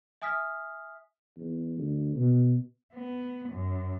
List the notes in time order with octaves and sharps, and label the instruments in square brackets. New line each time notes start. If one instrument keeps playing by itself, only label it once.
[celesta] E5 G#5 D#6 F6 B6
[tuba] E2
D2
B2
[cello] B3
F#2